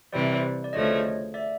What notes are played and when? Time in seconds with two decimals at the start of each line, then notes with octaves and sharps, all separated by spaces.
0.13 C3 E3 G3 C5 D5
0.64 D5
0.73 D2 C#3 F3 A3 C#5 D#5
1.34 D5 E5